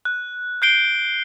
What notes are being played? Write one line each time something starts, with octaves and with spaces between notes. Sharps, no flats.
F#6
F#6 G6 C7 D7 G7